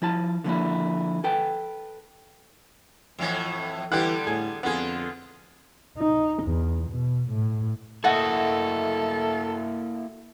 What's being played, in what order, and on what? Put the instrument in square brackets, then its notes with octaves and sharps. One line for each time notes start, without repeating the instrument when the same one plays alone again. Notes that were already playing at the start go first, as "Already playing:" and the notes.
[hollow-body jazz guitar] F3 E4 A5
D3 F3 A#3 E4
A4 B4 G5
[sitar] F2 A2 E3
[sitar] D3 G3 B3 [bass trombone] E3 [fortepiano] G4 F#5
[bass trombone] A2 [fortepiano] G#4
[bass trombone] F2 [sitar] D3 F4 [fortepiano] B3 G#4
[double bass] D#4
E2
B2
A2
[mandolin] A3 F#4 D#5 [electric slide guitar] A#3 E4 [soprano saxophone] A4